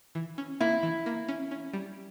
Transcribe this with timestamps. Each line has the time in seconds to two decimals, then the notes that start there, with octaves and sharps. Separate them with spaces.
0.15 E3
0.38 C#4
0.60 A#3 E4
0.83 E3
1.06 A#3
1.28 C#4
1.51 C#4
1.73 G3